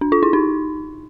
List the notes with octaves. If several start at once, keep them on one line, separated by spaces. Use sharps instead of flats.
D4
F4
E4
D#4